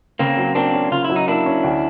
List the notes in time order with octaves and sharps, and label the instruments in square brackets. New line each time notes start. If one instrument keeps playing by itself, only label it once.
[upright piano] C#3 [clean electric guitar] A#3 C4
[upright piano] F#3
[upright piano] A#3 [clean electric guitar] C4 D4
[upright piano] C#4
[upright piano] C#3 [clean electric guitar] F4
[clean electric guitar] E4
[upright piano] F#3
[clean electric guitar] D#4
[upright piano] A#3 [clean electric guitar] D4 E4
[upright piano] C#4
D2